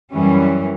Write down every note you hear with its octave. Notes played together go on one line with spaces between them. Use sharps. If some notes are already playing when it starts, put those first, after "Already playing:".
F#2 E3 G3 C#4